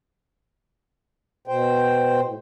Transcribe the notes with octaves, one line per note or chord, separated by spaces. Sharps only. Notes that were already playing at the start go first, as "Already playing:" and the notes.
B2 C5 G5
A2